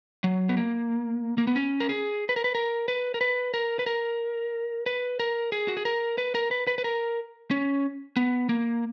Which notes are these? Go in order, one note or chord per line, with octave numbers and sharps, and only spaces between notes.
F#3
B3
A#3
A#3
B3
C#4
A#4
G#4
B4
A#4
B4
A#4
B4
A#4
B4
A#4
B4
A#4
B4
A#4
G#4
F#4
G#4
A#4
B4
A#4
B4
B4
B4
A#4
C#4
B3
A#3